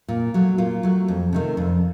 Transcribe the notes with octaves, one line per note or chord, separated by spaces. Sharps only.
A#2
F#3 A3
A#2 F4
F#3 A3
F2
C3 D#3 A3
F2